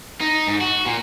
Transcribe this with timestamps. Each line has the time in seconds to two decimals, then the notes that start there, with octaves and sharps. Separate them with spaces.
0.21 D#4
0.48 G#2
0.61 F#4
0.86 A#2